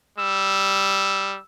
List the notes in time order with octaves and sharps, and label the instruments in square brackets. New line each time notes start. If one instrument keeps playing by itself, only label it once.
[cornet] G3 [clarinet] E6